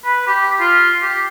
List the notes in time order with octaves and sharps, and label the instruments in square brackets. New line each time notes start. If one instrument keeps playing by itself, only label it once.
[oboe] B4
G4
F4
G4